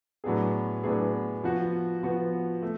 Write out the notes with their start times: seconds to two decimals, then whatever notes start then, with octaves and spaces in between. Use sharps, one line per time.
0.24 A2 F#3 B3 D4 G#4
0.83 A2 F#3 B3 D4 G#4
1.44 F3 B3 F#4
2.03 F3 B3 F#4
2.62 A3